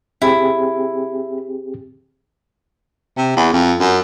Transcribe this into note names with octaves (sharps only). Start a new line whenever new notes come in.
C4 E4 G4 G#4
C3
E2
F2
F#2